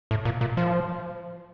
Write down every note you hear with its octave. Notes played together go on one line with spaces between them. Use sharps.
A2
A#2
A#2
F3